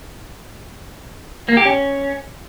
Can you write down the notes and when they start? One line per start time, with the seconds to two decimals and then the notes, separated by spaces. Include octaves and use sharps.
1.49 A#3
1.57 G4
1.65 C#4